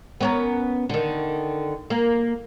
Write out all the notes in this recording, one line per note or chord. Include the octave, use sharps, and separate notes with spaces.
B3 C#4 A#4
D3 D#3
A#3